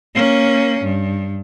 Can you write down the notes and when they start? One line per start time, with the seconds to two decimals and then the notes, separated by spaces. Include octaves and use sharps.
0.15 A#3 C#4
0.84 G2